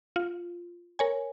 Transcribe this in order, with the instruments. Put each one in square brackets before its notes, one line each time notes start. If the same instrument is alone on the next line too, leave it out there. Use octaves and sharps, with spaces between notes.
[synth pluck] F4
A#4 C#5 G#5